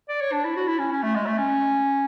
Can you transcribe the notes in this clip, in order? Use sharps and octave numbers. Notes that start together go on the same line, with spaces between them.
D5
C#5
D4
E4
F#4
E4
C#4
C#4
A3
G#3
A3
C#4